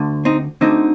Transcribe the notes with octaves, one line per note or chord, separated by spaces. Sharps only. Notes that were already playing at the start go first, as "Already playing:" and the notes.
Already playing: D2 D3
C4 D#4
D2 D3 C4 D#4